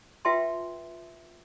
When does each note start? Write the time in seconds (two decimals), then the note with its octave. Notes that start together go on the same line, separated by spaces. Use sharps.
0.25 F4 B4 E5 G5 A5 C6